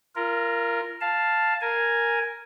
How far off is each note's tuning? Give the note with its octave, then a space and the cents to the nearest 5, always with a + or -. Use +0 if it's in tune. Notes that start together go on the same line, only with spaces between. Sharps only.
F4 -30 A#4 +0
F5 +0 A5 +0
A#4 +0 G#5 +0